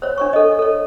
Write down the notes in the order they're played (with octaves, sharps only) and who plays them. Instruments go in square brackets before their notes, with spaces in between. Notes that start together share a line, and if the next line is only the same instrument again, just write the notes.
[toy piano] C5 C#5
D4 C#5 C#6
A4 D#5
A4 C#5